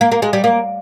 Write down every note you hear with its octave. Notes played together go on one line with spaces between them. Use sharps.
A#3
A#3
G#3
G3
A#3